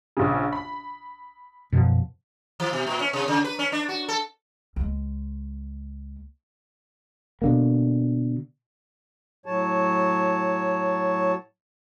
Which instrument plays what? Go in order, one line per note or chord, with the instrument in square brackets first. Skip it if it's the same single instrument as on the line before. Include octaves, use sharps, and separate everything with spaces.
[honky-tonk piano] A#1 C#3
B5
[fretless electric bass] F#2 B2 F3
[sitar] E3
B2
A#2
C#4
C3
C#3
B4
C#4
D4
F#4
A4
[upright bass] C#2 G#3
[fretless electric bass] B2 D3 A#3
[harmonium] A2 F#3 C#5 A5